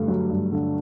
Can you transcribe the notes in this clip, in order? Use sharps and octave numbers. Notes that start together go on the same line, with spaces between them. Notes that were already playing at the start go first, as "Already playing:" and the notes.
Already playing: G2 D3 A3
F#3
G2
D3